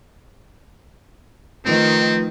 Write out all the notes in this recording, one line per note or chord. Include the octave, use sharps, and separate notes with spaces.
D#3 F3 A3 C4 F4 B4